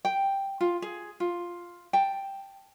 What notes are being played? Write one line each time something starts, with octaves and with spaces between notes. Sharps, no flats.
G5
F4
G#4
F4
G5 A5